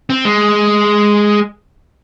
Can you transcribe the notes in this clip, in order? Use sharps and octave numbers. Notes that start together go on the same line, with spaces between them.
C4
G#3